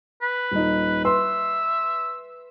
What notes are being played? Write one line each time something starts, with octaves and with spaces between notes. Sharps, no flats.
B4
D#1 D#4
B4 E5 C6